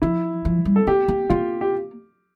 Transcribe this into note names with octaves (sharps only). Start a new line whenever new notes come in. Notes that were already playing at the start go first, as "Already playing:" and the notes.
F3 E4
F3
G3
A4
A#3 G4
A#3
A#3 F4
G4